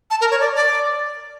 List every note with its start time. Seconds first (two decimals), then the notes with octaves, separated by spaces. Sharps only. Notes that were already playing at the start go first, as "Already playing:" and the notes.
0.10 A5
0.21 A#4
0.31 C#5
0.40 D5
0.56 D5